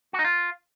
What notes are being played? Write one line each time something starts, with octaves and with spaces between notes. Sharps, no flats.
F#4
D#4
F4